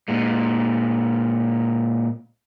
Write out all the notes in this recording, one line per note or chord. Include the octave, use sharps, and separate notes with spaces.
A#2 G#3